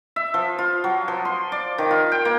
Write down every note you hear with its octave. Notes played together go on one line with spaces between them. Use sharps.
E5
F3
F4
F#3
F3
C6
D5
D#3
F4
G5
A#3